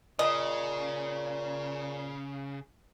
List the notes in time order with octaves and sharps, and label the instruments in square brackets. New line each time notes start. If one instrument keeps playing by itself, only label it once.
[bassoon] A#2 [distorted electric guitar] C#3 [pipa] D#5